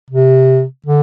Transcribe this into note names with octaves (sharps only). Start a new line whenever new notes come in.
C3
D3